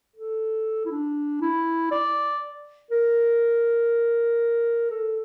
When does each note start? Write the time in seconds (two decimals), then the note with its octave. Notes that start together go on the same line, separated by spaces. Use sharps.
0.16 A4
0.85 E4
0.91 D4
1.41 E4
1.91 D5
2.91 A#4
4.91 A4